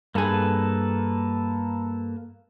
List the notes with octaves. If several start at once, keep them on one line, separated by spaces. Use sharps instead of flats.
G2 A#3 G#4 A4 B4